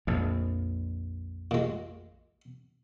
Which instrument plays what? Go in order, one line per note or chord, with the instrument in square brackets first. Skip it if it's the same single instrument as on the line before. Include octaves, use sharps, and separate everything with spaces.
[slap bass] A#1 F2
[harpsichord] A#2 G#3